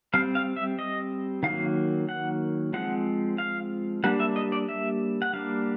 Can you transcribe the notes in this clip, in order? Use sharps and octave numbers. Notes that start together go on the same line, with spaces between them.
G3 C4 F5
F5
E5
D#5
D#3 F#3 A#3 F5
F#5
F3 G#3 C4 F#5
F5
G3 A#3 D4 F#5
E5
D#5
D5
E5
F#5
G3 A#3 D4 F5